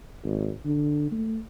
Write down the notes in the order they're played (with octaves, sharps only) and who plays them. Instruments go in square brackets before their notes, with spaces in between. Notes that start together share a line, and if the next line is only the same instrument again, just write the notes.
[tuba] G#1
D3
A3